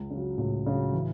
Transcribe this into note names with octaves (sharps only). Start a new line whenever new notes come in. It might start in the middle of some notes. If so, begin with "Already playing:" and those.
Already playing: C#2
C#3
F#3
C#2 A2
C#3 F#3
E3